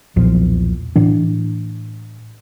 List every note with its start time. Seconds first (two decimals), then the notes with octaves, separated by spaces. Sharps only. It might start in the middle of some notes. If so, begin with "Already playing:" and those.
0.16 B1 E2 A#2 F3
0.96 A2 E3 D4